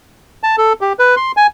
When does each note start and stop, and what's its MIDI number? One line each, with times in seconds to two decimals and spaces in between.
0.43 0.56 81
0.58 0.73 69
0.81 0.93 67
0.99 1.15 71
1.17 1.32 84
1.37 1.47 80